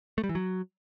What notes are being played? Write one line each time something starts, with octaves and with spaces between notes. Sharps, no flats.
A3
G3
E3
F#3